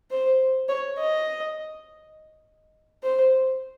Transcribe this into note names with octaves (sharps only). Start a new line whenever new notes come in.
C5
C#5
D#5
C5